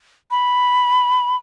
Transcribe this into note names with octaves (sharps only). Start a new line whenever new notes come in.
B5